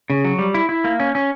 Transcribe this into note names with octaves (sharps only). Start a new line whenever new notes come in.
C#3
F#3
G3
E4
E4
A#3
C#4
C#4